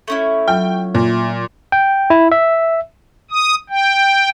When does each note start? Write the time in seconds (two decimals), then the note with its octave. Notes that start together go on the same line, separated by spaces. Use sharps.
0.08 A3 C#4 E4
0.48 F#3 F4 G5
0.95 A#2
1.72 G5
2.10 E4
2.32 E5
3.31 D#6
3.70 G5